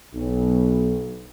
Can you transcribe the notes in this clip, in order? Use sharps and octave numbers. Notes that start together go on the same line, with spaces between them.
B1